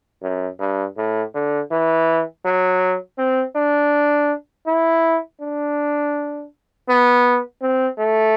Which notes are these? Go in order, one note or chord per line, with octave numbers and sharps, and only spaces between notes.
F#2
G2
A2
D3
E3
F#3
C4
D4
E4
D4
B3
C4
A3